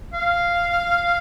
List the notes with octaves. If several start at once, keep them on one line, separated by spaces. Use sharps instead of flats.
F5